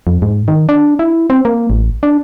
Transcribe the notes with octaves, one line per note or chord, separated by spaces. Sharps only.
F2
G#2
D#3
D4
E4
C4
A#3
A1
D4